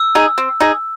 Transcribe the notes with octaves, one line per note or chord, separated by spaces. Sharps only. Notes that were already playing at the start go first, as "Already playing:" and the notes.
Already playing: E6
D#4 G#4
C4
D#4 G#4